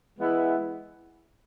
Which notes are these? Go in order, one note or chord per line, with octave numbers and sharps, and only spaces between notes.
E3 G#3 B3 E4